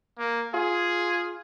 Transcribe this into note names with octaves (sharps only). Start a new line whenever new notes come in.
A#3
F4 G#4